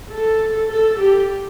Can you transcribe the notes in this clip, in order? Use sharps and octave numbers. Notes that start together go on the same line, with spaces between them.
A4
A4
G4